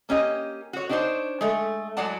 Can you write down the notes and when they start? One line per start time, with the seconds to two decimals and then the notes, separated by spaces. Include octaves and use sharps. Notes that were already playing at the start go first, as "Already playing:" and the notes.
0.09 A#3 C#4 G4 D#5
0.73 F#4 C#5
0.89 D4 D#4 G4 G#4 C5 C#5
1.41 G#3 A3
1.97 A2 F#3 G#3 D5 F#5 A5